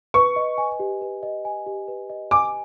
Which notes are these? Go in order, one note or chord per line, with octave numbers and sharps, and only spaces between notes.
B4 C#6
D#5
G#5
G4
B4
D#5
G#5
G4
B4
D#5
G#5 D6